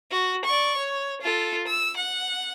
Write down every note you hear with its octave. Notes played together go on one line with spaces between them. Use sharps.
F#4
D5 C#6
C#5
F4 A4
E6
F#5